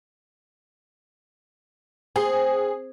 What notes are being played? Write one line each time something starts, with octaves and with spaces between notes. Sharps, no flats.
C4 G#4